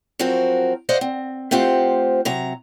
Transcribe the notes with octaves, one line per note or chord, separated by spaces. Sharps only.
F3 F#3 C4 F#4 A#4
C5 D5 D#5 F5 F#5
C4
A3 C4 F4 G4 C5 F#5
C3 F#3 A#5